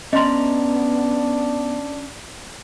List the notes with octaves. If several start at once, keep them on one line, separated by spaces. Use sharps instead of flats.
B3 C#4 D4 D#5 A#5 C6